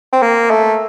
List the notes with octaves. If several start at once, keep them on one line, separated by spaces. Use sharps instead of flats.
C4
A#3
A3